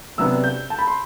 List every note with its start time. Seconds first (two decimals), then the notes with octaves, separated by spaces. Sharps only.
0.18 C3 F#3 B3 D4 E6
0.44 G6
0.70 A5
0.79 B5
0.87 C6